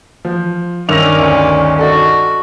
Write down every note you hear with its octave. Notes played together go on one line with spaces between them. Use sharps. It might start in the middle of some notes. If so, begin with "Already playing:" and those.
F3
G2 D#3 C#4 D5 D6 E6 A#6 F7
D2
F#4 A4 D5 D#5